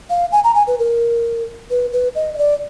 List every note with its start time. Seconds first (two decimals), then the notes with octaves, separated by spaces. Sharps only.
0.10 F5
0.32 G#5
0.44 A#5
0.55 G#5
0.67 B4
0.79 A#4
1.70 B4
1.92 B4
2.15 D#5
2.34 D#5
2.38 D5